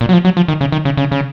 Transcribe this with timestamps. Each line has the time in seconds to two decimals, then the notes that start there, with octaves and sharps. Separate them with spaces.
0.01 A#2
0.09 F#3
0.13 F3
0.25 F#3
0.37 F3
0.48 D#3
0.61 C#3
0.72 D#3
0.85 C#3
0.97 C#3
1.11 C#3